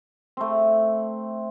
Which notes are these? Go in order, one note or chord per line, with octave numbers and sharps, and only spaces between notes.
A3 C4